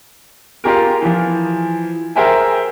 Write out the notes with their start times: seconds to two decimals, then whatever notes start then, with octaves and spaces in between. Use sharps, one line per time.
0.64 F4 G4 G#4 A#4
1.02 E3 F3
2.16 G#4 A#4 C5 E5 G5 G#5